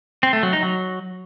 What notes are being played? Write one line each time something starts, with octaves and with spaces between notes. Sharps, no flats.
C4
A3
F#3
D#4
F#3